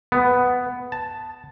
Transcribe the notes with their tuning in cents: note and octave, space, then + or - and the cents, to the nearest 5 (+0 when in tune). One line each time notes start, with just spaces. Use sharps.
B3 +5
A5 +0